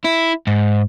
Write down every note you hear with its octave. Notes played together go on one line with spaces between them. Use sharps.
E4
G#2